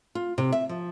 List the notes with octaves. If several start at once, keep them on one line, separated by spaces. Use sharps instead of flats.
F4
C3
E5
F3